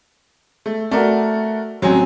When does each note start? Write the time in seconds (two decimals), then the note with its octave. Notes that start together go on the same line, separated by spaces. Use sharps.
0.66 A3
0.91 A3 F#4 A#4 D5
1.82 A1 F#3 C4 G#5